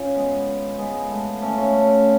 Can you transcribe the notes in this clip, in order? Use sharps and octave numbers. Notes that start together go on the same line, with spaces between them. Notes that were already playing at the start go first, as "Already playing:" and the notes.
Already playing: C#4 F4
G#3 B3
G#3 B3
G#3
A3
A3 C#4
C#4 F4
A3 C#4